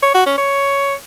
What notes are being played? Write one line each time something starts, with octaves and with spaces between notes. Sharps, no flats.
C#5
F#4
C#4
C#5